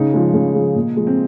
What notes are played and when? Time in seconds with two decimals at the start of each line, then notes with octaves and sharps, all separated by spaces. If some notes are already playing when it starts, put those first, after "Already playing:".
Already playing: C#3 D#4
0.13 F3 G#3
0.34 C#3
0.55 F3 G#3
0.75 A#2
0.96 F3 G#3
1.07 C4